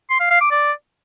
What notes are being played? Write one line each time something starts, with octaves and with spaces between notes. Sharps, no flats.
C6
F5
F5
D6
D5